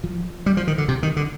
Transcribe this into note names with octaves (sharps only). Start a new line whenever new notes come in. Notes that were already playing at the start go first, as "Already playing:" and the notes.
F3
G3
F3
D#3
D3
C3
D#3
D3